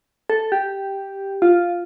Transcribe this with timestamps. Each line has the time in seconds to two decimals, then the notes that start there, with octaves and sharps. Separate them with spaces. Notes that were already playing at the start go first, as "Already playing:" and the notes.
0.30 A4
0.52 G4
1.42 F4